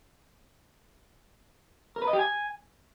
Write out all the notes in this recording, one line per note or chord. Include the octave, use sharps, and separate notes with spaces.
A#4
B4
D#5
G4
G#5